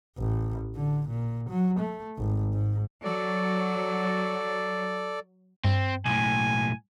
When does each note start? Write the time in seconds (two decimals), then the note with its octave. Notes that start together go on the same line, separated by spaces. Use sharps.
0.18 A1
0.75 D3
1.09 A#2
1.49 F#3
1.79 A3
2.18 G#1
2.53 G#2
3.04 F#3 A4 D5
5.65 G2 C4
6.05 B1 A2 G#5